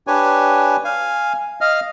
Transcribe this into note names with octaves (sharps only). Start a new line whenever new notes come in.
D4 G4 B4 C#5 G#5
F5 G#5
D#5 F5 F6